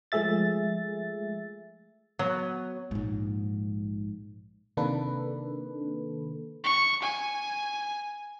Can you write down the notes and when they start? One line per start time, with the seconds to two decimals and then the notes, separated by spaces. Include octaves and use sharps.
0.12 F3 G#3 A3 G#4 E5 A6
2.19 F#3 B3
2.91 A#1 G#2
4.77 C3 D#3 A#3 D4 A4 B4
6.64 C#6
7.03 G#5